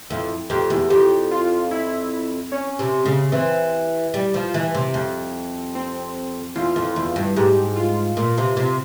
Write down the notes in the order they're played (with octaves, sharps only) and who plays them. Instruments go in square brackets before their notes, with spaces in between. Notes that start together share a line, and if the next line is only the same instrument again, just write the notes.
[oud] F2 [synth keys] E4
[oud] F2 [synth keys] G4
[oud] E2
[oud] F2 [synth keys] G4
[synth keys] F4
E4
C#4
[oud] C3
C#3
[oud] E3 [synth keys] C4
[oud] G3
F3
E3
C3
F2
[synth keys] C4
[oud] E2 [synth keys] F4
[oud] F2
E2
G2
[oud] G#2 [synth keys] G4
[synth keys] F4
[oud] A#2
C3
C3